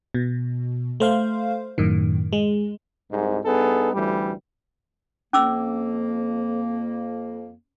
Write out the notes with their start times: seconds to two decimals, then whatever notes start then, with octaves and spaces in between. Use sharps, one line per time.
0.14 B2
1.00 A3 C5 F5
1.78 F#2 A2 D#3
2.33 G#3
3.11 C2 G#2
3.45 G2 B3 D#4 G#4 A4
3.93 A1 D2 E3 G3
5.33 F2 A#3 C#4 D6 E6